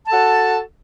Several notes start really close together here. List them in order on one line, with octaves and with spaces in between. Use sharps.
A5 A4 F#4